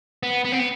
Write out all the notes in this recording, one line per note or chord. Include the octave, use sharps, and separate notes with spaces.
B3
B3
C4
B3